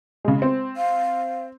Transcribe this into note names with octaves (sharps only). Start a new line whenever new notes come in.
C#3 G#3
C4
F5